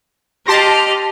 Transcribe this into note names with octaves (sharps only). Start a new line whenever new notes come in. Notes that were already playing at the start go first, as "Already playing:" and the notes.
G4 D#5 A5 C6 F6 A#6